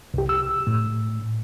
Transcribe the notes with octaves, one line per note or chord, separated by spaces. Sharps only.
C2 G4
E6
A2